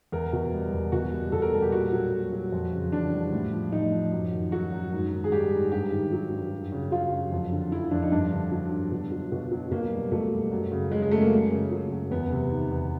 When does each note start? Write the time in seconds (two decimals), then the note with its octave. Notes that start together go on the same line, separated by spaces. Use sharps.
0.12 E2 A#4
0.33 B2
0.53 G3
0.73 E2
0.92 B2 F#4
1.13 G3
1.32 B2 A4
1.42 A#4
1.53 G3 A4
1.62 G4
1.72 A#2 F#4
1.93 F#3
2.12 A#2
2.32 F#3
2.52 F2
2.73 C#3
2.92 E3 D4
3.12 G3
3.33 A2
3.53 F3
3.72 A2 D#4
3.92 F3
4.12 F#2
4.32 D#3
4.52 F#3 F#4
4.72 F#2
4.93 G#2
5.12 D#3
5.24 G#4
5.32 G3 G4
5.53 G#2
5.72 G2 G4
5.92 D#3
6.12 F#3
6.32 G2
6.52 F#2
6.72 C#3
6.92 F#3 F4
7.13 F#2
7.32 F2
7.52 D3
7.72 F3 E4
7.91 F2 D4
8.03 D#4
8.12 G2 D4
8.32 D3
8.52 F#3
8.72 G2
8.91 B2
9.12 F#3
9.32 B2
9.52 F#3
9.71 B2 A#3
9.91 G3
10.12 B2 A3
10.32 G3
10.52 F#2
10.72 C#3
10.91 F#3 G#3
11.02 G#3
11.11 F#2 A3
11.21 A#3
11.32 F#2
11.52 C#3
11.72 F#3
11.91 F#2
12.11 E2 B3
12.32 C3
12.52 D#3
12.72 E2